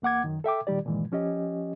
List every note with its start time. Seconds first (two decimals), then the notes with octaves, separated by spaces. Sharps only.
0.02 E2 A#3 F#5 D6 G#6
0.24 F#2 D#3
0.44 A4 E5 G5 D6
0.67 A#2 D#3 G3 G4 D5
0.85 G2 A#2 D#3 E3 G#3
1.12 F3 C#4 G4 D#5